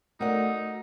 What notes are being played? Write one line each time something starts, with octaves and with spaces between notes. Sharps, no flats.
A3 D#4 F#4 A#4 D5 F#5